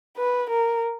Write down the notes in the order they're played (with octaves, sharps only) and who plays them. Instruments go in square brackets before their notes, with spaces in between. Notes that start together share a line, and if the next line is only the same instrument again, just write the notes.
[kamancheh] B4
A#4